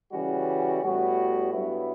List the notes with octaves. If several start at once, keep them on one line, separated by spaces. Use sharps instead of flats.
C#3 E3 G3 C#4 F#4
A2 G3 B3 F#4
G2 F#3 B3 E4